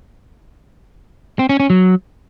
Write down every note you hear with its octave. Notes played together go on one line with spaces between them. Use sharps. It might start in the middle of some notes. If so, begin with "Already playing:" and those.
C4
C#4
C#4
F#3